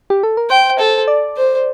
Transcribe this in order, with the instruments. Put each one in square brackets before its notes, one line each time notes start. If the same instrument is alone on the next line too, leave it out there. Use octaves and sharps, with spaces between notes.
[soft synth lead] G4
A4
A#4
[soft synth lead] C5 [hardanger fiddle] G5
[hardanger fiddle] A4
[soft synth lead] D5
[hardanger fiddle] C5